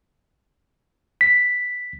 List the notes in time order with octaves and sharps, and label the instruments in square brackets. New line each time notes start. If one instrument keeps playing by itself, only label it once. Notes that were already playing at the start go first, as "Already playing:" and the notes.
[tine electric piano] B6